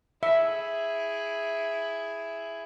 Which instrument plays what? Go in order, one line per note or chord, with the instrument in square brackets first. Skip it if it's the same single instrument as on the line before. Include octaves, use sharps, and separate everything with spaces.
[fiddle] E4 G#4 [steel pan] E5